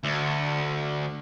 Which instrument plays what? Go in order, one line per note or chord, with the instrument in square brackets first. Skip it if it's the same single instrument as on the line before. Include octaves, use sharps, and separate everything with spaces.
[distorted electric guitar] D2